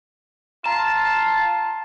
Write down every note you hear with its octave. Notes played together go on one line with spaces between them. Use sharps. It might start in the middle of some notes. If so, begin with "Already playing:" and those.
F4 A5 A#5